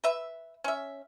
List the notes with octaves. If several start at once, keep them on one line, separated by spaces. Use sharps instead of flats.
B4 E5
C#4 E5